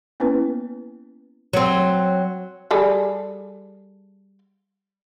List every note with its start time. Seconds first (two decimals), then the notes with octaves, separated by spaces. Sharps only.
0.20 A#3 B3 C#4 E4 B4
1.53 F#3 C4
2.71 G3 G#4 A4